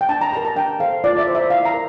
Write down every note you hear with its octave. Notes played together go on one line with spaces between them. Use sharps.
G5
D4 A5
A#5
G4 A#4 A#5
A5
D4 G5
A4 C5 F5
F4 D5
E5
C5
E5
E4 F5
A#5
A#4